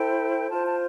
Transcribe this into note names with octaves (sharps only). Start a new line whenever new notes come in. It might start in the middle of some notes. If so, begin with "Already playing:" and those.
Already playing: E4 A4 C5 G5
F4 C5 A5
A5